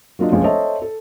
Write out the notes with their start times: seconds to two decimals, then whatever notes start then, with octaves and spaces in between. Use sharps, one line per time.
0.19 F#3 A#3 D4 F4 D#5
0.31 F1 A#1 F3 G#3 C#4 G#4
0.43 A4 C5 C#5 D#5 E5 A5
0.82 A4